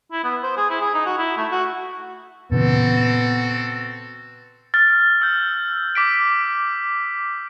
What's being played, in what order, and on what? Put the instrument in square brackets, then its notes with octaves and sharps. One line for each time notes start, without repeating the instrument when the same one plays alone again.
[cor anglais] E4
B3
C5
G#4
E4
G#4
D#4
F#4
E4
A3
F#4
[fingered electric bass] A#2 C#3 E3 [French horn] B3 [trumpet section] C4 F#4 A4
[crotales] F6 [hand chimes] A6
[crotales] E6 G6
D6 B6 D7